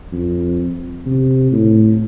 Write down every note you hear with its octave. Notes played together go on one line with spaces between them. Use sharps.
F2
C3
A2